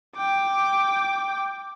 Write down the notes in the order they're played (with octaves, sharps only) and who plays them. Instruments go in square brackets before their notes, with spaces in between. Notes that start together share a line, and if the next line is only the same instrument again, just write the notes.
[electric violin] G5 D6